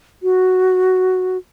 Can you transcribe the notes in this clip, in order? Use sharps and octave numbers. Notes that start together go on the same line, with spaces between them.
F#4